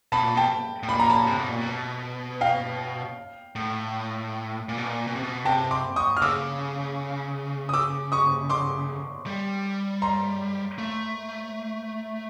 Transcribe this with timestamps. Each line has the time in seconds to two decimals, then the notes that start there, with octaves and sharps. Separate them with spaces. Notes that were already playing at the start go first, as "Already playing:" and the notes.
0.12 B2 A5 B5
0.23 A#2
0.35 B2 G5 A5
0.83 A2
0.89 A#2 B5
0.99 A#5
1.10 A5 B5
1.27 C3
1.38 B2
1.49 A#2
1.61 B2
2.41 F5 G5
3.55 A2
4.69 A#2
4.78 B2
4.86 A#2
5.07 B2
5.15 C3
5.23 B2
5.45 C3 G5 A5
5.71 C6 D6
5.96 C#6 D#6
6.17 F6
6.22 C#3 D6 E6
7.69 D#6
7.73 D6 E6
8.12 C#6 D#6
8.50 C6 D6
9.26 G3
10.02 A#5 C6
10.78 A3